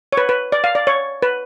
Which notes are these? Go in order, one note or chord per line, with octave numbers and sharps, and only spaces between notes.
C#5
B4
B4
D5
F5
D5
C#5
B4